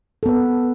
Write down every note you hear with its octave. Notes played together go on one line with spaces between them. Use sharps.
B3 A4 B4